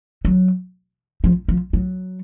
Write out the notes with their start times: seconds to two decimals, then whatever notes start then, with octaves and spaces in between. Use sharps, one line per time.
0.25 F#3
1.24 F3
1.48 F3
1.73 F#3